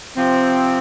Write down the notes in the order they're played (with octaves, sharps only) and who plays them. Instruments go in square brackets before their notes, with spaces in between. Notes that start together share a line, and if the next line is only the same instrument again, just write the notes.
[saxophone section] C3 F3 C4